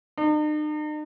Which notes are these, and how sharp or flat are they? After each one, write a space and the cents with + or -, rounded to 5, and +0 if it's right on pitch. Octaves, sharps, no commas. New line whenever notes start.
D#4 -45